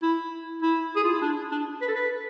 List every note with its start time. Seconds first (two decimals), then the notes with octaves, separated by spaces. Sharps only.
0.03 E4
0.62 E4
0.96 G#4
1.04 F4
1.14 E4
1.21 D4
1.52 D4
1.81 B4
1.88 A4
1.96 B4